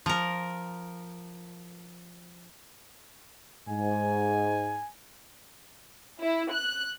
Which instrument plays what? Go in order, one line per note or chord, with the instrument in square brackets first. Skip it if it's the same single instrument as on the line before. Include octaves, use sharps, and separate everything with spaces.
[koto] F3 A#4
[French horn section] G#2 [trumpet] G#5
[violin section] E4
F#6